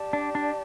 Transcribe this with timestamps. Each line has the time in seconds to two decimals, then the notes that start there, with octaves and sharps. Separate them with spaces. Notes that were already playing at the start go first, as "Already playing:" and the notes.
Already playing: G4 D5 A5
0.13 D4
0.35 D4